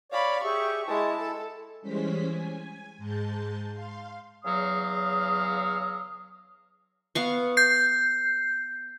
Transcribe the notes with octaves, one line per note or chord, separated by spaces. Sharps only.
C#5 D5 F5 B5
G4 G#4 E5 C#6
G#3 E4 A5
A4
E3 G3 G#3 C#4 C5 B6
G#5
G#2 G#3 A5 G6
F5 C6
E2 C#3 F#3 F5 D#6
B3 F5 C#6
G6 C7